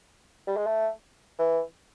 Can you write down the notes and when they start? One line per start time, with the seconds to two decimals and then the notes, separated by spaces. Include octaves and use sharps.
0.47 G3
0.57 G#3
0.66 A3
1.39 E3